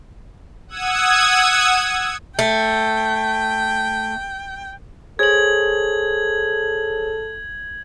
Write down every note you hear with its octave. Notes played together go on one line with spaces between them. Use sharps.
F#5 D#6 E6 G#6
A3 G5
G#4 A4 C5 C#5 G#6 F#7